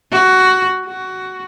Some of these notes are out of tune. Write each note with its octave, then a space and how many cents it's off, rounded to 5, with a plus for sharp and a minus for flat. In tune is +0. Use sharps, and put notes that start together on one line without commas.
F#4 +15
F#4 +15